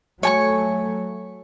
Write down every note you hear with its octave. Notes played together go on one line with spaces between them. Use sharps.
F#3 A3 C#5 G#5 C#6